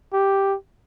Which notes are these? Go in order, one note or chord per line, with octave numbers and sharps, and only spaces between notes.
G4